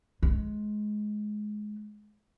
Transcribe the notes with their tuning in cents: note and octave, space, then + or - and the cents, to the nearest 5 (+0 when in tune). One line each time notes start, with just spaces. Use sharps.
G#3 +20